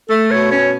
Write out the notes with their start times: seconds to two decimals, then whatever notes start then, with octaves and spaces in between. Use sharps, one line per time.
0.09 A3 A4
0.31 B2 C#5
0.52 C#4 C#5